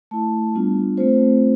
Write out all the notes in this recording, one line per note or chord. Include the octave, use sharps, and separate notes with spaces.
A3 E4 A5
G3 B3 D4 F4
A3 C4 F4 C5